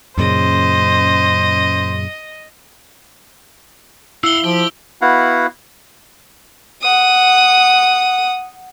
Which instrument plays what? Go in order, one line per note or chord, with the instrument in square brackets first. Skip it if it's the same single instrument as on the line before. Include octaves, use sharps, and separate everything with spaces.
[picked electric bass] F#2 A#2 C#3 [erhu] C5 [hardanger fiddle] D#5
[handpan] E4 [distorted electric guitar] F5 F#5 [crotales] E6 G7
[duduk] F3 [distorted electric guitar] G4
[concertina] B3 E4 F#4 F5 F#5
[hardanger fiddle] F#5 D#6